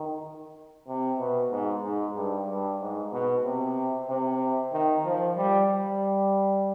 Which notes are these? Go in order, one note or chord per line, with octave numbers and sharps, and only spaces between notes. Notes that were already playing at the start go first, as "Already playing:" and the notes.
Already playing: D#3
C3
B2
G#2
G#2
G2
G2
G#2
B2
C3
C3
D#3
F3
G3
G3